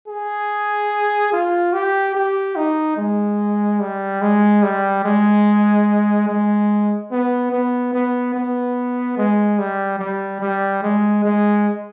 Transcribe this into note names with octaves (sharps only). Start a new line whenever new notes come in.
G#4
F4
G4
G4
D#4
G#3
G3
G#3
G3
G#3
G#3
B3
B3
B3
B3
G#3
G3
G3
G3
G#3
G#3